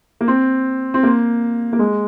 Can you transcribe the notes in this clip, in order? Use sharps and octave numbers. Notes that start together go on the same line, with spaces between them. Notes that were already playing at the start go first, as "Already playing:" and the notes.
A#3
C4
C4
A#3
A#3
G#3